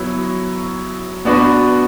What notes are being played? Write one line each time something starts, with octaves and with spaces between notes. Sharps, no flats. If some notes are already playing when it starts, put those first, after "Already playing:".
Already playing: F#3 B3 E4 C#5
B3 D4 F#4 B4